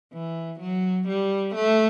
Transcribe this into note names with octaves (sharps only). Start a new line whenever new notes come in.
E3
F#3
G3
A3